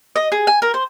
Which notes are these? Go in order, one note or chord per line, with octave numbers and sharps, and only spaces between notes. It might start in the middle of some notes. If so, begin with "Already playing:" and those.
D#5
G#4
G#5
A#4
C5